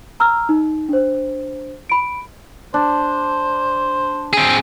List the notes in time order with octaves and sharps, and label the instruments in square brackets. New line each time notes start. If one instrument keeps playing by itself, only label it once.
[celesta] A#5 E6 F6
D#4
D4 C5
B5 D7
[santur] D4 [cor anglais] C5
[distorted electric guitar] C4 G#4